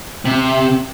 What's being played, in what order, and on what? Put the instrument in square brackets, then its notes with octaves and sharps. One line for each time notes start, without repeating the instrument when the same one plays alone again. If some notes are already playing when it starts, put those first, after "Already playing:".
[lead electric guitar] C3